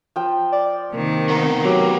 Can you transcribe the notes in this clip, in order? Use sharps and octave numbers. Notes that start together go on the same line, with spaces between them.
F3 G5
D5
C3 D#3 A#3
B3 A#4
F#3 G4